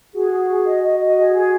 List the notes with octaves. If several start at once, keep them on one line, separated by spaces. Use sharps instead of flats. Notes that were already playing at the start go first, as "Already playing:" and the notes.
F#4 G#4
G#4
G#4
D#5
D#5
D#5
G#4
G#4